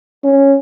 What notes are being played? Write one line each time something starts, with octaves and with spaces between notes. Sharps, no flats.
C#4